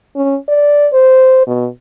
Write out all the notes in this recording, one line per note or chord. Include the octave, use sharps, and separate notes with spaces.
C#4
D5
C5
B2